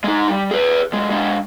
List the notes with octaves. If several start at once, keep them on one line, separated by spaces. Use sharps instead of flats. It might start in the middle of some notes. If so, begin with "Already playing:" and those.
G#3 D#4
G3
G#4 B4
B1 G#3
G#3 D4